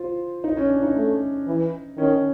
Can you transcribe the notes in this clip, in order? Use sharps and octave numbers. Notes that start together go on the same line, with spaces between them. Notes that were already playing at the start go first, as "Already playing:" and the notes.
Already playing: F4 C5
D#4
C#4
D4
D#4
A3
E3
D#3 C#4